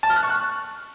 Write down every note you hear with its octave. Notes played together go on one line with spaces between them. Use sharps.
A5
F6
F#6
C#6
F#6